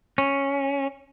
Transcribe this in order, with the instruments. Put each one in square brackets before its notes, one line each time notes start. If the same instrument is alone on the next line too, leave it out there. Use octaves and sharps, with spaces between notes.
[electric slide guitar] C#4